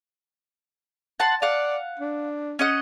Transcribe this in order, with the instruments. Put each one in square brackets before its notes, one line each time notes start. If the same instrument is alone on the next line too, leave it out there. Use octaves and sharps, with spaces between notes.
[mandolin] F#5 A5 C6
[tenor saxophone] D5 [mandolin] F5 F#5
[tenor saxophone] D4
[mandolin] C#4 D#5 F#5